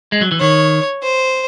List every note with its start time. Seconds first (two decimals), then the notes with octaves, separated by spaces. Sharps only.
0.12 G#3
0.21 F#3
0.31 E3
0.40 D#3 C#5
1.03 C5